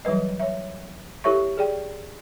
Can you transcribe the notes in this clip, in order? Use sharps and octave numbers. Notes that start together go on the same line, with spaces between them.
E3 F#3 G3 B4 D#5
C#5 E5
E4 G4 A4 C#5 E5 C#6
G#4 D5 G5